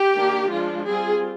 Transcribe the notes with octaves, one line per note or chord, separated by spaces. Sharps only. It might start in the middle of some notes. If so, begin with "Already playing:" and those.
Already playing: G4
D#3 A#3 D4
F3 G#3 D4 F4
G3 C4 F4 G#4